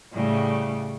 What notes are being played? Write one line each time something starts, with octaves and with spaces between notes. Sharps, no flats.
A2 C#3 G3